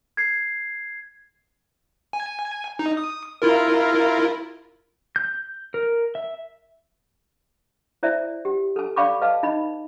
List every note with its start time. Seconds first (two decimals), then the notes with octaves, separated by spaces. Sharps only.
0.17 G#6 C7
2.13 G#5
2.79 D#4
2.97 D#6
3.42 E4 F4 A#4
5.16 G6
5.74 A#4
6.15 E5
8.03 E4 C5 D5 E5
8.45 G4
8.76 A4 G#5
8.96 D5 F5 G5 B5 C#6 D6
9.22 B4 D#5 F5 A5
9.43 D#4 D#5 B5